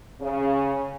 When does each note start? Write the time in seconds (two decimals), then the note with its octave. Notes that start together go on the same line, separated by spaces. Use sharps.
0.21 C#3